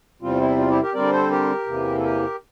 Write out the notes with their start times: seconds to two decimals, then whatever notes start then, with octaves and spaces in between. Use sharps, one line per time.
0.21 E2 C3 G3 C4 F4
0.40 E4
0.58 F4
0.69 E4 G4
0.82 G4 A#4
0.94 D3 G3 C4 A#4 D5
1.12 A4 C5
1.30 G4 A#4
1.66 E2 C3 E3 A#3
1.98 A4
2.03 G4 A#4